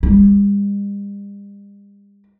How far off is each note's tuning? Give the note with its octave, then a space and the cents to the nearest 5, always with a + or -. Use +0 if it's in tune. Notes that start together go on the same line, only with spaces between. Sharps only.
G3 +45